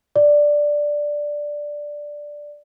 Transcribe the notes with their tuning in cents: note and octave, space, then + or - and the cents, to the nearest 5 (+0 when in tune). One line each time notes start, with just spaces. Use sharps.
D5 +0